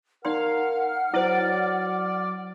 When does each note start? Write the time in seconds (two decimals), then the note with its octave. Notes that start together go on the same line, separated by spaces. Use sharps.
0.25 D#4 A#4 D5 F5 F#5 C6 F6
1.14 F#3 E4 C5 D5